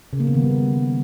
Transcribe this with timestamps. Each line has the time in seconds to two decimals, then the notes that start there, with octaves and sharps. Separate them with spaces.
0.13 C#3
0.20 A#3
0.27 B3
0.34 D#3
0.42 G3